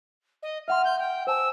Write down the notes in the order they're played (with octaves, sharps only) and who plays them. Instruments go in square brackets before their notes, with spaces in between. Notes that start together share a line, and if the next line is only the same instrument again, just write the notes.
[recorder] D#5
[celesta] E5 F#5 C6 [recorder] F6
[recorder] G6
G5
[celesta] C5 G#5 A5 [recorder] E6